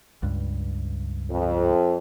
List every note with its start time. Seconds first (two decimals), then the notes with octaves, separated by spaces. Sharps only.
0.23 C#2 G2
1.30 F2